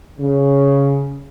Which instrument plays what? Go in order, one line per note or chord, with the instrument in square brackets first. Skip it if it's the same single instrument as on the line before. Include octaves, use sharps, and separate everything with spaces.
[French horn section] C#3